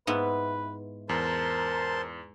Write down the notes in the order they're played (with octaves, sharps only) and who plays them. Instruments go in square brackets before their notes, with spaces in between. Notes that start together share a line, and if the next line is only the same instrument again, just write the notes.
[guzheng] G#2 B3 E4 [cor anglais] B4
[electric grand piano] E2 [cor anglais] A#4 [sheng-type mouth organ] C5 A5 C6